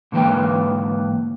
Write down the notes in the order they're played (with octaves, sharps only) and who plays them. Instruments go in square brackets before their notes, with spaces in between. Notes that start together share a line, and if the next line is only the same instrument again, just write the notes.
[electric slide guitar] G#2 D3 E3 A#3 B4 G5